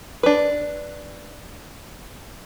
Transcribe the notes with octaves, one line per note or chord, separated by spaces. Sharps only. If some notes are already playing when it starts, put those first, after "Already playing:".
D4 B4